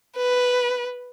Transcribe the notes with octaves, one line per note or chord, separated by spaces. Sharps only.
B4